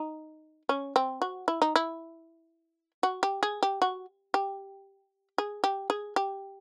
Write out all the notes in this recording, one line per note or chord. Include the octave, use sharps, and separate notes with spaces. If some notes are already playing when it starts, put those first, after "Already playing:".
Already playing: D#4
C#4
C4
F#4
E4
D#4
E4
F#4
G4
G#4
G4
F#4
G4
G#4
G4
G#4
G4